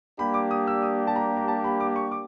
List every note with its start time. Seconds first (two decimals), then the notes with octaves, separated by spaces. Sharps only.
0.19 G3 A#3 D4 G4 B5
0.34 D6
0.51 D#6
0.67 E6
0.83 D#6
1.07 A5
1.16 A#5
1.37 A#5
1.48 A5
1.64 B5
1.80 D6
1.96 C#6
2.12 D6